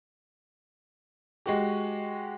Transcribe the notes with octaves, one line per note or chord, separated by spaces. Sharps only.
G#3 F#4 G4